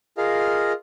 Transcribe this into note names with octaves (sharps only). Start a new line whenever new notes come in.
F4 G#4 A#4 D#5 F5